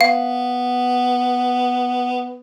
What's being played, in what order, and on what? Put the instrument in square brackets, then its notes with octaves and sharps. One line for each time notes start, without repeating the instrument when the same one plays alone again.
[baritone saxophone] B3 [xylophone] F5